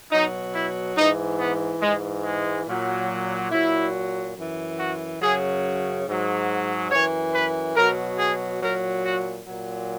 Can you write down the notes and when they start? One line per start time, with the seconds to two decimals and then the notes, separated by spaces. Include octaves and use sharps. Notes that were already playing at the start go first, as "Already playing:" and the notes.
0.12 B2 F#3 D#4
0.55 E4
0.97 G#2 E3 D#4
1.40 B3
1.82 G#2 E3 G#3
2.24 G#3
2.66 A#2 F#3
3.51 A#2 F#3 E4
4.37 F#2 E3
4.79 F#4
5.21 F#2 C#3 F#3 G#4
6.07 G#2 F#3
6.91 F#2 E3 C#5
7.35 B4
7.76 B2 F#3 A#4
8.19 G#4
8.62 A#2 F#3 A#4
9.04 F#4
9.46 A#2 F#3